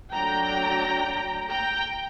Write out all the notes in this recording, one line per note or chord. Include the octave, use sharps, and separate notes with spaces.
F#3 A3 D4 G5 A#5
G5 A#5